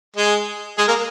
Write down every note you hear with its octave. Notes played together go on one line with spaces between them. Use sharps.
G#3 G#4
G#3 G#4
A#3 A#4